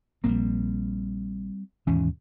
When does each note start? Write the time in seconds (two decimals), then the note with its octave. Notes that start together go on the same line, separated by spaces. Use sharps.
0.24 A#1 G3 G#3 A#3 C4
1.87 D#2 G#2 B2 E3 C#4